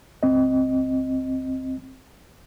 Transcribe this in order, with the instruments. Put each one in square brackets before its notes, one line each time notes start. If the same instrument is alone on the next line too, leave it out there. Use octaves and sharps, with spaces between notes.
[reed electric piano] C#2 C4 D#5